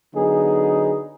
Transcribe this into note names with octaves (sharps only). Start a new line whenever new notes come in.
D3 F#3 B3 D#4 G#4